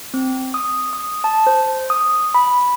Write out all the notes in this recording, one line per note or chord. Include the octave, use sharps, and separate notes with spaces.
C4
D#6
D#6
A5
C5
D#6
B5